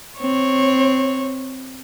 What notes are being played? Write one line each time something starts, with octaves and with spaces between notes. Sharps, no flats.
C4 C#5